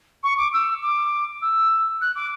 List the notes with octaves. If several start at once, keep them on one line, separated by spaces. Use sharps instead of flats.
C#6
D6
E6
D6
E6
F#6
D6